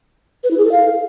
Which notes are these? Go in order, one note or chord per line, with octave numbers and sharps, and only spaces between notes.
B4
E4
G#4
A4
F5